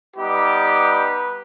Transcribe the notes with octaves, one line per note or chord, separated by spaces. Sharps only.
G3 B3 D#4 G4 B4